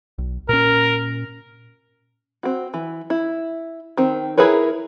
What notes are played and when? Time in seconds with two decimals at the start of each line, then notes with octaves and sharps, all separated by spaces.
0.18 B1
0.49 A#2 C#4 A#4
2.43 C4 F#4
2.74 E3
3.10 E4
3.97 D#3 C4
4.38 E4 G#4 A#4 B4 C#5